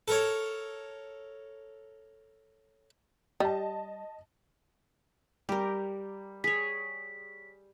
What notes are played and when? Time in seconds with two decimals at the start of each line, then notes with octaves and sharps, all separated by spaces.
0.08 A4 A#4 C#5
3.40 G3 D#5 A5
5.49 G3 G4 A#4
6.44 G#4 C#5 B6